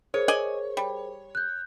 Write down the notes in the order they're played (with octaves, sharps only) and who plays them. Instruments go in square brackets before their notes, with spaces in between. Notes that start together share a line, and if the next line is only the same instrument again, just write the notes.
[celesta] G#4 A#4 C5 [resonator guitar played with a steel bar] C#5
[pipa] D5 D#5 G#5
G3
[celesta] F#6 G6